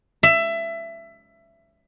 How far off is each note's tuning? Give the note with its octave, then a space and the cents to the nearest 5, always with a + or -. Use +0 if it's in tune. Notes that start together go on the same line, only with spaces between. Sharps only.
E5 +20